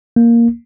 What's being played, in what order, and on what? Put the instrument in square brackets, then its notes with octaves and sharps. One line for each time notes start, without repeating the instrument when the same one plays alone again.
[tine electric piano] A#3